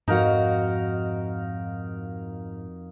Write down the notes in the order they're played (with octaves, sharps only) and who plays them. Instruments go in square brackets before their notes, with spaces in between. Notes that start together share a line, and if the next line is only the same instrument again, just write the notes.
[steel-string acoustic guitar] F2 F#4 [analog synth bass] G#2 [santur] D#4 A#4 F5